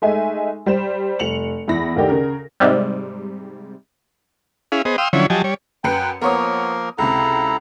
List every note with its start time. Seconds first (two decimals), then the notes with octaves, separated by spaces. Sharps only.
0.02 G#3 A3 D#4 E5 G#5
0.66 G3 C5 E7
1.19 F1 C#7 F7 F#7
1.68 E2 E4 B5 A#6
1.96 D2 D#3 G4 D5
2.09 C#3 A#4
2.60 G#2 C3 G3
4.72 C#4 E4 G#4 F5
4.85 B3 G#4 C5 D#5
4.98 F5 G5 C6 D#6 E6
5.13 D3 F3 F#3 C#4 E4 C#5
5.30 F3 F#3 G4 D#5 G#5 A5
5.44 G3 C#5
5.84 F#2 B4 G5 C#7
6.21 F3 A#3 B3 A#4 C#5 D#6
6.98 C#2 C3 E4 A4 A#5